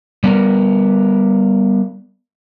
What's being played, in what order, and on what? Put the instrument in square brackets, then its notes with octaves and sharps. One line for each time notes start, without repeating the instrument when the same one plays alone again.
[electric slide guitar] G3 B3 A#4